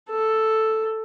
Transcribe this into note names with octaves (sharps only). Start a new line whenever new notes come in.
A4